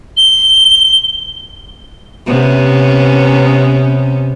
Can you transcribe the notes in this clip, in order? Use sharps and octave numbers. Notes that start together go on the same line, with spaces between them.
G7
C3 B3 C#4